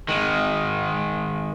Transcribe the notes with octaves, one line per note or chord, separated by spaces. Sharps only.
D#3 G#3